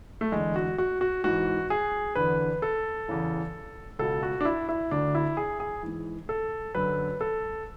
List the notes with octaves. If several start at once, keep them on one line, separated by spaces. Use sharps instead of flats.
A3
E2 D3 G#3
F#4
F#4
F#4
G#2 E3 F#4
G#4
E2 D3 B4
A4
E2 C#3 E3
C#2 B2 A4
F#4
D4
E4
E4
D2 D3 D4
E4
G#4
G#4
G#2 E3
A4
F#2 D3 B4
A4